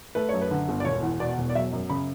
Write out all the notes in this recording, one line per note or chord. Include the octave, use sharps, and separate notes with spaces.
A3 B4
F#2 C#5
B4
D3
G1
D5
E1 C#5
E2
B2 D5
E1
D5
F#3 E5
F#2
C#3 B5